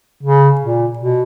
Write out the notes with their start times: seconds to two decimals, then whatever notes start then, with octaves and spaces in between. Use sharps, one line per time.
0.23 C#3
0.61 A#2
0.98 B2